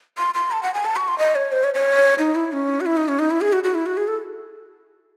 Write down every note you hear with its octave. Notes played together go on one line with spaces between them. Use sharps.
C6
C6
A5
F#5
G#5
A5
C#6
C6
D#5
C#5
C5
C#5
C#5
D#4
E4
C#4
F#4
E4
D#4
C#4
D#4
E4
G#4
F#4
F#4
E4
F#4
G#4
A4